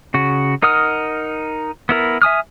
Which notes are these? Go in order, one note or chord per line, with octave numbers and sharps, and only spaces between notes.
C#3 F#4
D#4 A#4 F#5 D#6 F6
B3 E4 A#4
E5 G#5 D#6 F6